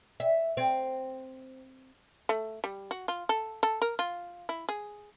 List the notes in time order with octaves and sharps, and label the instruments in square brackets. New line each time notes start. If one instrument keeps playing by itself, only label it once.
[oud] E5
C4
[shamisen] A3
G3
F#4
F4
A4
A4
A#4
F4
E4
G#4